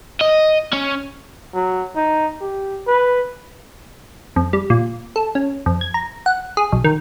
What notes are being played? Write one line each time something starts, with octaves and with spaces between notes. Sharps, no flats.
D#5
C#4
F#3
D#4
G4
B4
F2
G3
A#2
A4
C#4
F2
G#6
A#5
F#5
G#4
B1
D#3